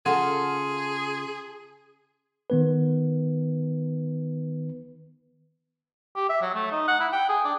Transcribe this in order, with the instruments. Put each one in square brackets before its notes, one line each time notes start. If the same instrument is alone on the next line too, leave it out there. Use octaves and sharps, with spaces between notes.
[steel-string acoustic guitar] C#3 F4 A4 [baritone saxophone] G#4 [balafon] F#5 [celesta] C6
[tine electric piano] D#3 B3 B4
[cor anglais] G4
E5
F#3
A3
D#4
F#5
E4
G5
G#4
D4